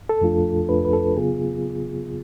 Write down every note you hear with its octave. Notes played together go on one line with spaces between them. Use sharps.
A4
F2 F3 A3 D4 F4
F2 F3 A3 D4 F4 B4
B4
A4
C#3 F#3 B3 F4 G#4